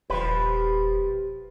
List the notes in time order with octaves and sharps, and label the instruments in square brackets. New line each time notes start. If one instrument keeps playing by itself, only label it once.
[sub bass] D#1 [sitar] F3 G4 [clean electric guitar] B4